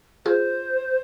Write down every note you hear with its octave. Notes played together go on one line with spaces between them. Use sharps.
F4 G#4 C5